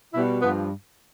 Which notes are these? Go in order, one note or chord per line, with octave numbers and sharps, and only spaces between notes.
B2 G3 E4
G2 F3 B3